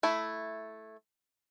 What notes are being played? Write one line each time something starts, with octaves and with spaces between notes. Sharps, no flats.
A3 E4